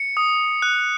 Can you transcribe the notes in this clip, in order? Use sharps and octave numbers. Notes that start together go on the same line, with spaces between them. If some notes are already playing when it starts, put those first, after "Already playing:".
Already playing: C#7
D#6
F#6